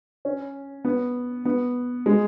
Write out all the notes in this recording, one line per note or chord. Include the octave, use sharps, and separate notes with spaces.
C#4
B3
B3
G#3